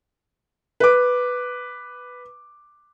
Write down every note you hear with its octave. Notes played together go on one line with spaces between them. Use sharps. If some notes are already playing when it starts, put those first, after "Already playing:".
B4 D6